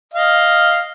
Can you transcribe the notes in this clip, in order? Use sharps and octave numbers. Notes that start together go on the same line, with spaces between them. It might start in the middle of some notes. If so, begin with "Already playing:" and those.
D#5 F5